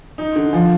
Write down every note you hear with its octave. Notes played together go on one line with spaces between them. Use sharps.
D#4
D3
F3